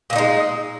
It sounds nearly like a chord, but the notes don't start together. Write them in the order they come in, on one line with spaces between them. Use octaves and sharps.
A#2 A#3 D#4 G#3